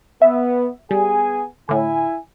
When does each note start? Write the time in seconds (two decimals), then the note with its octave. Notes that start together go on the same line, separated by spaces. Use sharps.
0.22 B3 E5
0.91 G3 B3 G#4 G#5
1.69 A2 D3 E4 G#5